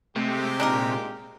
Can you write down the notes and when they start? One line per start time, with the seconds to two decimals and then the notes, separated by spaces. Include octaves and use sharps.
0.16 C3 G#3 A3 G4
0.60 A#2 D4 D#4 A#4